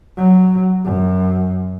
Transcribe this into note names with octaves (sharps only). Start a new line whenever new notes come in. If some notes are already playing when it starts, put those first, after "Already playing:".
F#3
F#2